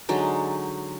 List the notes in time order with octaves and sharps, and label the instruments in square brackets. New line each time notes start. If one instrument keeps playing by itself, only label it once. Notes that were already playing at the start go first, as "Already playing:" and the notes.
[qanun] D3 F#3 G#3 D#4